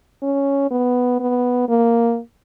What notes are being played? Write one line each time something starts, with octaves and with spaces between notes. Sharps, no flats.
C#4
B3
B3
A#3